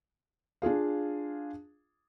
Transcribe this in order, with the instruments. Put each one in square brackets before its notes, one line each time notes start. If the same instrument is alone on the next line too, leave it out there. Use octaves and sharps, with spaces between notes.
[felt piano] D4 F4 G#4 F5